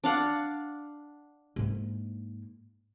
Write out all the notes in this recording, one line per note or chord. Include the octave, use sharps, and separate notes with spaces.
D4 F5 F#5
G#2 A#3